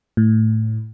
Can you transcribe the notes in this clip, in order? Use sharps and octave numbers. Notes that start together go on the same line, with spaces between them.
A2